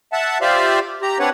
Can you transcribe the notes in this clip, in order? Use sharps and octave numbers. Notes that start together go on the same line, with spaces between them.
E5 F#5 A5
F4 G4 C5 D5 E5 F5
G4 A#5
C4 D4 B4 C#5 F#5